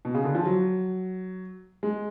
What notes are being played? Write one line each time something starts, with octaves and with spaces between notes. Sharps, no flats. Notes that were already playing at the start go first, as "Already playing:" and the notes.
B2
C#3
D3
F3
F#3
G#3